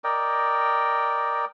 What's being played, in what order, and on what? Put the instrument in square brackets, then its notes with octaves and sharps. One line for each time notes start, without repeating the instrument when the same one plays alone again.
[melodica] A#4 D5 D#5 G5